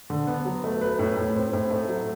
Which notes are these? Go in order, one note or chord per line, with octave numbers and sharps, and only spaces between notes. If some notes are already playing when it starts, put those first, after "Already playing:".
D3
B3
F#3
A3
B4
A2
A2
C4
A2
A3
F#3